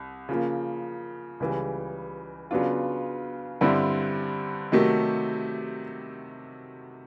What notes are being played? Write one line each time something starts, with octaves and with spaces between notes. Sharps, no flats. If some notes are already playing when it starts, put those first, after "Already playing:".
Already playing: C2
C#3 F3 A#3
C#2 C#3 E3 G3
C#3 F#3 B3 D4 F4
G2 D3 G3 C4 E4
C3 D#3 F#3 A3